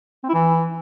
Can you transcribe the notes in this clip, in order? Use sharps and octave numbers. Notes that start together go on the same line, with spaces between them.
C4
E4
E3